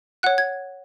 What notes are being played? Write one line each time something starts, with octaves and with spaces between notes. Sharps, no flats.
C#5 F#5 F#6
G#6